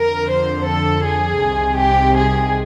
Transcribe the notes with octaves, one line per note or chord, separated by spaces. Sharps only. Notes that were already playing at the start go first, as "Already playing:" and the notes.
Already playing: F2 D3 F3 A#4
C5
A4
G#4
C2 C3 D#3
G4
G#4